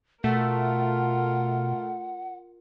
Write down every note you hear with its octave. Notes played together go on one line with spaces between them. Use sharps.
B2 A3 F4 A#4 F#5